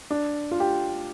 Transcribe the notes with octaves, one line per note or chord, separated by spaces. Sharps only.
D4
F4
G4